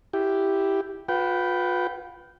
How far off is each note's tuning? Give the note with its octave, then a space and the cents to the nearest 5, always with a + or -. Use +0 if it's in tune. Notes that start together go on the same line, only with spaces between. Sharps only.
E4 +0 G4 +0
F4 +40 B4 +0 G5 -20